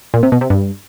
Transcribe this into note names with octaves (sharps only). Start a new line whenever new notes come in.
A#2
C3
B2
C3
G2